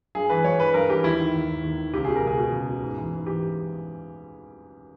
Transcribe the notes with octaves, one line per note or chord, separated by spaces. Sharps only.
G2 G#4
E3 B4
G2 C#5
E3 B4
G2 A#4
E3 G4
D#2 E4
D#3
D#2
D#3
D#2
D#3
C#2 G4
B2 G#4
A#4
C#2 G#4
B2
C#2
B2
G#2
E3
G#2
E3 G4